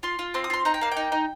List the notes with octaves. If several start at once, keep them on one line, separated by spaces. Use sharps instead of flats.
F4 C6
F4
C4 C6
D#6
F4 C6
D#4 A#5
G5
A#3 F5
G5
D#4
D#4